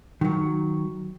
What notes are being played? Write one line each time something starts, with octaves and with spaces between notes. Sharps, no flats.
D#3 F#3